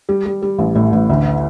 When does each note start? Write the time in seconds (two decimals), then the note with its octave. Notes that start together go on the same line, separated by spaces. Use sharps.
0.09 G3
0.26 G3
0.42 G3
0.59 A1
0.75 A2
0.93 A1
1.09 D2